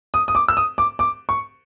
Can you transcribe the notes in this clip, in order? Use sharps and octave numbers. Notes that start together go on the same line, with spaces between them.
D#6
D#6
D6
E6
D#6
D6
D6
C#6